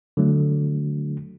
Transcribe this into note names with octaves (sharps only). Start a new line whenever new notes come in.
D3 F#3 A3